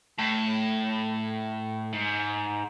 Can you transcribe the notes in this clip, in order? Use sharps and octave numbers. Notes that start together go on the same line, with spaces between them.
A2
G#2